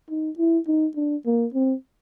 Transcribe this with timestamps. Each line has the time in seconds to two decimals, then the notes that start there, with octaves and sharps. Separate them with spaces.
0.10 D#4
0.38 E4
0.67 D#4
0.96 D4
1.26 A#3
1.53 C4